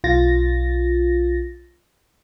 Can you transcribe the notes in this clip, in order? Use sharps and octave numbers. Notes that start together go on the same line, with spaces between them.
B1 F4 A6 A#6